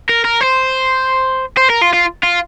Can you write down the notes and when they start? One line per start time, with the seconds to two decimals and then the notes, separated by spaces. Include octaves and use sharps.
0.09 A#4
0.25 A#4
0.41 C5
1.57 C5
1.70 A#4
1.82 F4
1.93 F4
2.23 F4